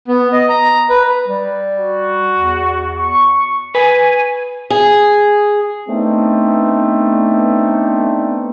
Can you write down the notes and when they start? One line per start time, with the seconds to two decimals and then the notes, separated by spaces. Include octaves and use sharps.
0.08 B3
0.33 D#5
0.49 A#5
0.89 B4
1.28 G3
1.77 F#4
2.35 E2
2.98 C#6
3.75 B4 G#5
4.70 G#4
5.89 A3 B3 C4 D4 D#4